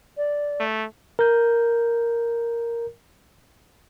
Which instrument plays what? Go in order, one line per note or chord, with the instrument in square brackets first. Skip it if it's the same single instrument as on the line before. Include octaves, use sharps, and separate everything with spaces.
[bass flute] D5
[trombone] A3
[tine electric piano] A#4 G6